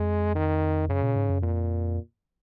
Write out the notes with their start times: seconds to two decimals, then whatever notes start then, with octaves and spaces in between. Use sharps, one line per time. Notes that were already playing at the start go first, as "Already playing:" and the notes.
Already playing: F2 G#3
0.35 D#3
0.89 F#2 C#3
1.02 A#2
1.16 G#2
1.30 F#2
1.42 F2 A#2